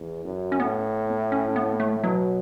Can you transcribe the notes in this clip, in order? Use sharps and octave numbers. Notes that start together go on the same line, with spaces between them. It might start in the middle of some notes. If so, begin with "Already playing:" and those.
Already playing: E2
F#2
C#4
A2 B3
C#4
B3
A3
B2 F#3